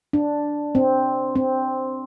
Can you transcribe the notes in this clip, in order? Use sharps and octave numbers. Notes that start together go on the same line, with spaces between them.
D4
C4
C4